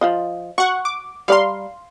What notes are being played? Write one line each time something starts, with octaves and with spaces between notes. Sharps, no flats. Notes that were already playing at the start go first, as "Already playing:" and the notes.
F3 F4 D#5
F#4 F#5 C#6
D6
G3 D5 F5 A#5 C6